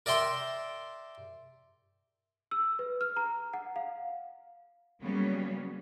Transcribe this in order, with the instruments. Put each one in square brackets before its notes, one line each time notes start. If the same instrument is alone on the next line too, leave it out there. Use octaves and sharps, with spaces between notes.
[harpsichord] A#4 D5 E5 G5 C6
[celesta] E6
B4
F6
A#5
F#5
F5
[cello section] C#3 F#3 G3 A#3 B3 C#4